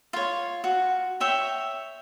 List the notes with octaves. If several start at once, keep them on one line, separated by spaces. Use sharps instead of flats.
F4 C#5
F#4
C#5 E5 G5